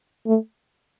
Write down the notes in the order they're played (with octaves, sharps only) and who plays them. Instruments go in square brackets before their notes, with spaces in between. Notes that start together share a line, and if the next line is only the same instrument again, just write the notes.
[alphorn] A3